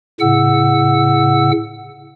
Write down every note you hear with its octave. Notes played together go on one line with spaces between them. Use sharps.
A2 C#3 F#5 E6